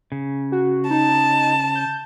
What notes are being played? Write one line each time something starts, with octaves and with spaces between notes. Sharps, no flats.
C#3
F#4
D#4 A5
G6